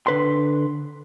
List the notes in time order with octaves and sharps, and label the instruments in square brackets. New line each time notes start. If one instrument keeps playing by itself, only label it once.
[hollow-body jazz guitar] D3 B4 C6